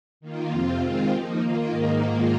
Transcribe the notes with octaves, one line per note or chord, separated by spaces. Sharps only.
D#3 A#3 F4
F2 C3 F3 C4 F4
D#3 G#3 C4 F4
F3 A#3 D#4 G4
D#3 A#3 F4
G#2 D#3 A#3 D#4
G#2 D#3 A#3 F4